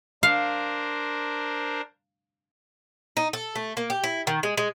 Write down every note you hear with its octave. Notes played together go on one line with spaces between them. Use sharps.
D4 A#4 C5 F5
D#4
A4
A3
A#3
G4
E4
D#3
G#3
G#3